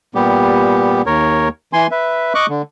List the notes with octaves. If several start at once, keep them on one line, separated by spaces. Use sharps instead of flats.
A#2 G3 B3 G4
D#2 A#4 C#5
E3 G#5 C6
B4 E5
D#5 C#6 D6 F#6
D3